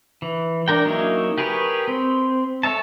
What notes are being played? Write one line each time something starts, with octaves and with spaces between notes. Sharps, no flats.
E3
D4 A#4 G5
F#3 A#3 C#4 D#4 E4
G4 G#4 A#4 B4 C#5
C4
A4 C#5 E5 A5